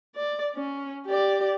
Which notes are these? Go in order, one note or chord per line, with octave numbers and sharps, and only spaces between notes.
D5
C#4
G4 D5